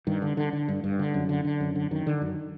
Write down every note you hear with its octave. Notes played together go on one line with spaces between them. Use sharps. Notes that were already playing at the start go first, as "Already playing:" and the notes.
G2 D#3
D3
D3
D3
G2
G2
D3
F#2
D3
D3
F#2
D3
F#2 D#3
D3
F#2